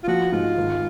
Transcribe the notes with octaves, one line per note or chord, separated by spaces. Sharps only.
F4
F3 F#4
G#2 F4
G#1